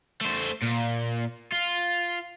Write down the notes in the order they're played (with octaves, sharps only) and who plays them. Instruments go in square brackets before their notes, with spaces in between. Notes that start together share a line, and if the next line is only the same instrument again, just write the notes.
[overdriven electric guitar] A3 C5
A#2
F4